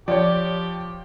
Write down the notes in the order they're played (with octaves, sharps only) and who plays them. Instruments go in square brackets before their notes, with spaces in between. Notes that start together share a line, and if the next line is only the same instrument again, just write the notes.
[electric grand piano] F3 [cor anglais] G4 [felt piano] C#5 D5